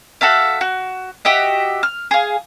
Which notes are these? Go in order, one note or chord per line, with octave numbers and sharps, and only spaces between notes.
F#4 A4 E5 F5
F#4
F#4 G4 D#5 E5
F6
G#4 F5